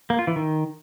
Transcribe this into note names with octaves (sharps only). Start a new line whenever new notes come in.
A#3
F4
E3
D#3